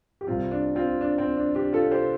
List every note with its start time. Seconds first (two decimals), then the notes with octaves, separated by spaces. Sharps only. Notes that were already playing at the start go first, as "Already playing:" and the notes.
0.21 G4
0.27 C2 C3 G3 C4 F4
0.51 D4
0.76 C4 F4
1.01 D4
1.18 C4
1.37 D4
1.55 D4 G4
1.73 F4 A4
1.91 G4 C5